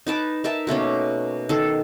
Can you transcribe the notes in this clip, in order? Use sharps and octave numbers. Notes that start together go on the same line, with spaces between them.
D#4 B4 A5 D6
D#4 A#4 E5 A5
B2 A3 A#3 C#4
D#3 A4 F5